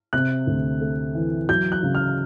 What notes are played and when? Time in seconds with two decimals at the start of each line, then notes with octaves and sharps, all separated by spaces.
0.13 C3 F#6
0.47 D2
0.81 A3
1.15 E3
1.49 F#3 G6
1.72 F#6
1.83 C#3
1.95 F6